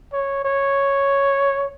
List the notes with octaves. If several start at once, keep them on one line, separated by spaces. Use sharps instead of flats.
C#5
C#5